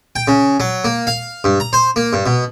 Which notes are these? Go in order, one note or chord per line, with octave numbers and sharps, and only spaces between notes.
G5
C#3
F#3
A#3
F5
G2
A#5
C5
A#3
G2
B2